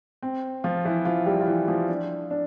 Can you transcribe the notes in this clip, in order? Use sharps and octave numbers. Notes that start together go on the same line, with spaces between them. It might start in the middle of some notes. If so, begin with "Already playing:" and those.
C4
F3 F4
E3 E4
F3 F4
G3 G4
F4
E3 E4
F3 F4
D4
D4